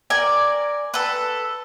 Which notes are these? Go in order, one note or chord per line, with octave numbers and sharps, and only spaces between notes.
A#4 D5 G#5
A4 B4